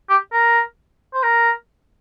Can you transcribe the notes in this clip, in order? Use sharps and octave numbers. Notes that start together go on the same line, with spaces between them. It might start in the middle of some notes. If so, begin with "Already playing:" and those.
G4
A#4
C5
A#4